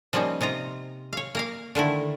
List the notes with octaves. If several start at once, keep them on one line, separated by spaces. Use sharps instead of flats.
F3 G3 A#3 C#4 D#4
C3 D#4 F4 A#5
C#5 F5
A#3 A#4 F5
D3 D#3 A3 E4